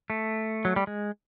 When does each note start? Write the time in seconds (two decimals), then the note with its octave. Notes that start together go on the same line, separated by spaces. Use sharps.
0.10 A3
0.65 F#3
0.76 G3
0.87 G#3